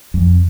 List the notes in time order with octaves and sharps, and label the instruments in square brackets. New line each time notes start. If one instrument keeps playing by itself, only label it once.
[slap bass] F2